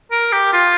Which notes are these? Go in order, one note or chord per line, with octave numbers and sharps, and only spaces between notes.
A#4
G4
F4